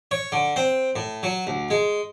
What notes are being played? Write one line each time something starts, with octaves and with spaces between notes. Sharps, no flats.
C#5
D3
C4
A2
F#3
D2
G#3